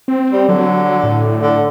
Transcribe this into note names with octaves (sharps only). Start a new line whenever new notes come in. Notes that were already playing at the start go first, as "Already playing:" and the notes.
C4
G3
D3 F#3
A2
D3